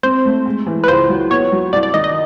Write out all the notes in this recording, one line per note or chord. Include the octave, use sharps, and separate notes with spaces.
C4 C5
A3
G#3
E3
B4
C#2 C5
F#3
B3 C#5
F#3
C2 D5
D5
D#3 D#5
D#5